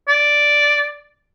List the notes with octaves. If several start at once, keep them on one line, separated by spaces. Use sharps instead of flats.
D5